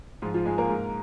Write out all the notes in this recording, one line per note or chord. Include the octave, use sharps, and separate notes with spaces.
G#2 F3 F4
F3 F4
G#2 G#3 G#4
A#3 A#4
G#2